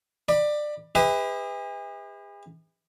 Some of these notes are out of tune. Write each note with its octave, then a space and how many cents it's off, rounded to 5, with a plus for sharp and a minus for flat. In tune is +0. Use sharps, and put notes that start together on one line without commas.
D5 +20 B5 -10
G#4 -45 B4 +20 E5 -40